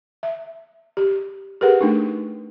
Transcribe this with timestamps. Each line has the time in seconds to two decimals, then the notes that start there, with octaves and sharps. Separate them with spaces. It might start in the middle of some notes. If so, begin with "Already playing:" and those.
0.23 E5
0.97 G4
1.61 G4 G#4 A#4 B4 F#5
1.81 A3 D4 D#4